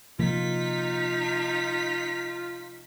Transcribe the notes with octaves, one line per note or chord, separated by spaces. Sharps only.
C3 F3 A#3 D#4 F4 B6